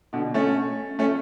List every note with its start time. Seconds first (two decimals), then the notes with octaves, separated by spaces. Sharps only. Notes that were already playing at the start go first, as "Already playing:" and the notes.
0.13 B2 D3
0.34 A3 C#4
0.99 A3 C#4